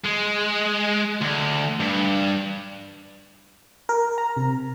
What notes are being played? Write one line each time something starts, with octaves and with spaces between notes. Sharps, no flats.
G#3
D2
G2
A#4
A#5
C3